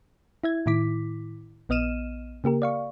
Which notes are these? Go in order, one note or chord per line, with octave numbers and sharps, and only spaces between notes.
E4 E5 G#6
A2 D#3 E4 D6 B6
A#1 B3 D#5 F6 D#7 E7
C#3 A#3 G4 A#4
D5 F5 C#6